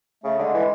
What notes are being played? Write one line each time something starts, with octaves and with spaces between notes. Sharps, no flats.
C#3 A3
D3 G#3
E3